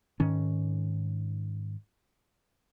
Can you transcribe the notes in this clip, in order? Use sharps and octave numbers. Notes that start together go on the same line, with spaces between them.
G#2 D#3 C#4